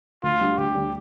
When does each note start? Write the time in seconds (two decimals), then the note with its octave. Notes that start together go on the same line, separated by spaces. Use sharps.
0.23 D2 F4
0.40 D3 G3
0.58 D2 G4
0.75 D3 G3